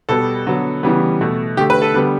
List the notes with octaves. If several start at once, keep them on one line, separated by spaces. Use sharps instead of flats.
B2 G3 B3 A4
D3 F#3 B3
C#3 E3 G3 B3
B2 A3
D3 A3 G4
B4
A4
D3 G3 B3